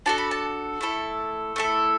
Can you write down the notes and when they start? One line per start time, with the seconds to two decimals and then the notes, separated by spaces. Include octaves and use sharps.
0.06 D4 F#4 A4 A5
0.18 B5
0.31 A5
0.81 A3 E4 A4
1.56 A3 E4 A4